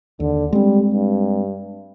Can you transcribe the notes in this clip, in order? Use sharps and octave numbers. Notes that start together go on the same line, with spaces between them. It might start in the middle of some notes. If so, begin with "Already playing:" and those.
D#2 D3
G3 G#3 C4
G2